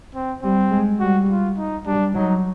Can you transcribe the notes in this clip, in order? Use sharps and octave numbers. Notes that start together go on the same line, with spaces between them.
C4
G3 C4
G#3
G3 F#4
F4
D#4
G3 D4
F#3 D#4